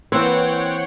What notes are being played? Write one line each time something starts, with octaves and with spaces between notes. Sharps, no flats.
E3 A#3 C4 B4 C#5 F#5 G5